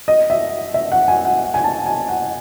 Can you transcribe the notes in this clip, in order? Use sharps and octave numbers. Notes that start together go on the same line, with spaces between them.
D#5
E5
E5
F#5
G#5
F#5
F#5
G#5
A5
G#5
F#5